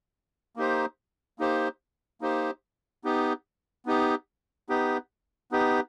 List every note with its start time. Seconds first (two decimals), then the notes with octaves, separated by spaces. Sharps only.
0.56 A#3 D#4 G4 C5
1.39 A#3 D#4 G4 C5
2.21 A#3 D#4 G4 C5
3.04 B3 D#4 G4
3.86 B3 D#4 G4
4.69 B3 D#4 G4
5.52 B3 D#4 G4